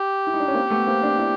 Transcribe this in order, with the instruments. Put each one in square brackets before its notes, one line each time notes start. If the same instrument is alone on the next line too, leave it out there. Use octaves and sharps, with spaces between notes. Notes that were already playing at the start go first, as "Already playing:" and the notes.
Already playing: [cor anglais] G4
[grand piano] E4
D#4
D4
C#4
A#3 C4
A3 B3
A#3 C4
C4 D4
D4 E4